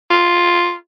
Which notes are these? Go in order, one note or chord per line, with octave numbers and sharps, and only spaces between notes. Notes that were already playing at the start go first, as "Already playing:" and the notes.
F4